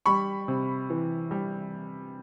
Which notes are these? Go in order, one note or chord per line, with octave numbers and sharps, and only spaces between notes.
G3 B5 C#6
C3
E3
G3